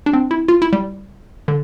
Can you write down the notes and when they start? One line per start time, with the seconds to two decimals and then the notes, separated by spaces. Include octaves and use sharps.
0.06 D4
0.13 C4
0.31 E4
0.48 F4
0.62 E4
0.73 G3
1.48 D3